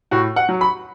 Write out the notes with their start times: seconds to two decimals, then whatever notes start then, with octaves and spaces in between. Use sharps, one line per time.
0.11 A2 F#4
0.36 F#5
0.49 F#3
0.61 B5